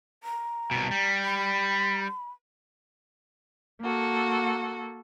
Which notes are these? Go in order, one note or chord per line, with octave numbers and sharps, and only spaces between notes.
A#5
C2 B2
G3
B5
A#3 F#4 A4